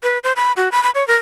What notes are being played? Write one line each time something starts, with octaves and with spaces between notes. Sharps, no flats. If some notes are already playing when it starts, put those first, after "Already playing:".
B4
C5
B5
F#4
B5
B5
C#5
A#4